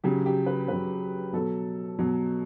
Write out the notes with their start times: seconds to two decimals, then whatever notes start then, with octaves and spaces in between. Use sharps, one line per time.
0.04 C#3 F#3 G4
0.26 G4
0.46 B4
0.68 C#3 F#3 B4
1.33 B2 F#3 A4
1.99 B2 F#3